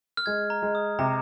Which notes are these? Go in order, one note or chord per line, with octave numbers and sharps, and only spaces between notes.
F6
G#3 G#6
A#5
G#3
D#6
C3 A#5